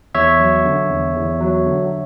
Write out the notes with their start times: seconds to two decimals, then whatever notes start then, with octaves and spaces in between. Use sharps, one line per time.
0.15 E2 C#5 E5
0.40 F#3
0.65 D3
0.90 E2
1.16 E2
1.41 F#3
1.66 D3